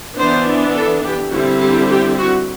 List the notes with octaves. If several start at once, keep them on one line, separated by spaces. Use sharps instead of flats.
E3 B3 D4 C5
A4
G4
D3 G3 C4 E4 F#4
G4
G4
F#4